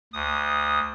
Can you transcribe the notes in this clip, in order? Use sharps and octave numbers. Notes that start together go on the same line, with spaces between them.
D2 D#6